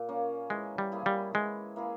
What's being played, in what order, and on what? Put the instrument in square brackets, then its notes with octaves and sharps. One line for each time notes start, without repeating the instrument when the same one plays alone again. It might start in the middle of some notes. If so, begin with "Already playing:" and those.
Already playing: [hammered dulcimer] A#2
A#3 C#4
[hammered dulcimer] E3 [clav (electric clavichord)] G#3
[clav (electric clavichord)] G3
[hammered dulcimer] A#3 E4 G#4
[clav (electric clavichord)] G3
[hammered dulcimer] E3 [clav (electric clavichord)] G#3
[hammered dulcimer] A#3 E4 G#4